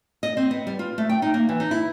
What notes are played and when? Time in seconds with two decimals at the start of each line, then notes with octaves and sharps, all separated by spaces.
0.23 D#5
0.37 C4
0.51 B3
0.67 G3
0.79 F4
0.98 A3
1.09 G5
1.22 D#4
1.34 A#3
1.49 E3
1.60 D#4
1.71 E4